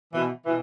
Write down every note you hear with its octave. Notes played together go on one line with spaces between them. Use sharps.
B2 E3
B2 E3